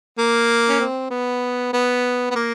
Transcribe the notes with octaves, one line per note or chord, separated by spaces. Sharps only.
A#3
C#4
C4
B3
B3
B3
A#3